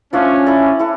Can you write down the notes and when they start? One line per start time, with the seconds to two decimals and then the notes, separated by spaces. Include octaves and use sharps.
0.13 F3 A3 C#4 D4 F4
0.46 E4 A4 D5
0.79 E4 A4